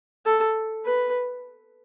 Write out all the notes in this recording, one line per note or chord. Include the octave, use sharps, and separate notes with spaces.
A4
B4